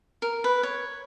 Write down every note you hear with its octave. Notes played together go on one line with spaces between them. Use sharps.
A#4
B4
C#5